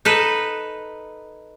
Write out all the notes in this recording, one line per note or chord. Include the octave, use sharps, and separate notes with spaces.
D#4 A4 B4